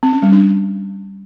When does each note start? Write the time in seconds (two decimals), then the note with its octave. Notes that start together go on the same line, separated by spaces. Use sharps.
0.03 C4
0.13 C#4
0.22 G3
0.32 D4